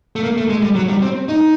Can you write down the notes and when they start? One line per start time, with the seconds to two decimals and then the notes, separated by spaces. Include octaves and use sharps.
0.16 A3
0.23 A#3
0.37 A3
0.50 G#3
0.62 G3
0.76 F#3
0.89 G3
1.02 C4
1.29 D#4